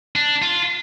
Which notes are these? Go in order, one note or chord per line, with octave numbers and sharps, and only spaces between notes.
D4
F4